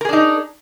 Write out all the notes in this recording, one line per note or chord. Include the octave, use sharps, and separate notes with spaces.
D4 D#4 G#4 A#4